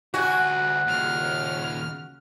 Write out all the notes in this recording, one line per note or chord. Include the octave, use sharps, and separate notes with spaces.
D2 F#4 G#5
D#2 A#2 C#3 F6